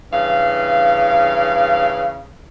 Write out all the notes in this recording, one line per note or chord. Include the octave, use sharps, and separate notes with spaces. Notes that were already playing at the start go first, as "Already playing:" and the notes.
G2 C#3 E3 F5